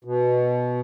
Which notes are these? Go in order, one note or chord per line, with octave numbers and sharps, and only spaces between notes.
B2